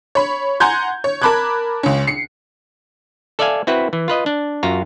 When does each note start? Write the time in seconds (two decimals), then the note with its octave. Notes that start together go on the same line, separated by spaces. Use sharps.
0.15 C#5 B5
0.60 F#5 G#5 A#5 C6 G6 G#6
1.04 C#5
1.22 A#4 A5 B5 D6 F#6 G#6
1.83 C#2 C#4
2.07 C7 C#7
3.39 A4 D5 E5 F5 G#5
3.67 C4 E4 F#4 B4
3.93 E3
4.08 F4 B4 D#5
4.26 D4
4.63 F#2 F4 F#4 A#5